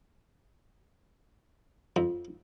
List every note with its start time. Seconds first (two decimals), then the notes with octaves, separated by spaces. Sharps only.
1.96 F2